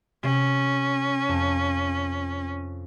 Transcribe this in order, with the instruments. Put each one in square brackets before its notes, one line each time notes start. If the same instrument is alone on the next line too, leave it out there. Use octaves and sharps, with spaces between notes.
[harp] C3 [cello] C#4
[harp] F2 A5 E7